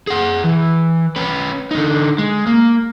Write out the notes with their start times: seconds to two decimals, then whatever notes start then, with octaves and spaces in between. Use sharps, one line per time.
0.07 G#4 F#5
0.44 E3
1.16 C#4 B4
1.71 D3 D#4
2.19 G#3
2.46 A#3